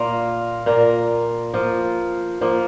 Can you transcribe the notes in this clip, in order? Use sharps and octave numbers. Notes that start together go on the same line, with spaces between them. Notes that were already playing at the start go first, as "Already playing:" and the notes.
Already playing: A#2 A#3 F4 A#4
A#2 A#3 F4 A#4
F3 A#3 F4
F3 A#3 F4